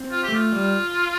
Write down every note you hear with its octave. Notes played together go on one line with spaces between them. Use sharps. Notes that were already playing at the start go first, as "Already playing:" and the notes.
Already playing: C4
F4
G4
A3
F4
G3